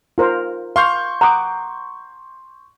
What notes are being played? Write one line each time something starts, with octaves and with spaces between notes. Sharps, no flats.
F4 A#4 C5
F5 C6 C#6 G6
F#5 A#5 D6 D#6